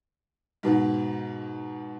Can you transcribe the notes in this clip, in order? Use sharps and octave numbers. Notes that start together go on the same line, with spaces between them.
G#2 B2 D#3